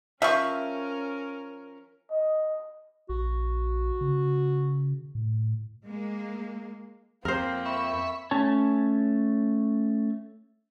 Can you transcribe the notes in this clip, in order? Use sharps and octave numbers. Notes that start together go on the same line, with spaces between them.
F3 C#4 A#4 E5 C#6
D#5
A#1 F#4
C#3
A2
G#3 A#3
F2 A#3 C4 A#4 C5
E5 B5 C#6
A3 C#4 C#5 A5